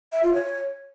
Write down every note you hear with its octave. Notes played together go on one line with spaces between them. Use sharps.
E5
F4
C#5